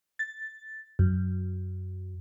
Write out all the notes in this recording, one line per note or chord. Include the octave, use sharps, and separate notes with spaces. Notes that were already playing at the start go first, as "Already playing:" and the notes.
A6
F#2